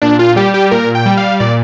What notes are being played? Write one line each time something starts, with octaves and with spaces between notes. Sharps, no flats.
A#2 D4
F4
G3 G4
G4
A#2 A#4
G5
G3
F5
A#2 D5